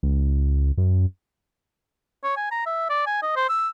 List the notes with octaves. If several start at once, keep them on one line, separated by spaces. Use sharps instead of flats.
C#2
F#2
C#5
G#5
A#5
E5
D5
G#5
D#5
C5
E6